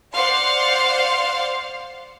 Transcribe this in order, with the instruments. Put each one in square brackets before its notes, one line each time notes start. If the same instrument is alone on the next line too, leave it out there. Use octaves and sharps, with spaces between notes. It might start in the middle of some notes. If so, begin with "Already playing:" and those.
[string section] C5 D5 F5 F#5 C6